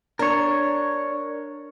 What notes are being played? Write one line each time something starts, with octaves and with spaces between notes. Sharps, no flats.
D4 A#4 C#5